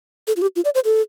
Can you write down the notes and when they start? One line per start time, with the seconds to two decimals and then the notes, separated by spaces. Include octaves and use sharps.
0.27 A4
0.36 F4
0.42 G4
0.56 F4
0.65 D5
0.75 C5
0.85 A4